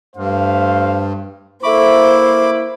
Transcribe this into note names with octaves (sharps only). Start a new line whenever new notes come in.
G2 A3 C5 F5
A#3 E4 A4 C5 E5 B5 C#6 D6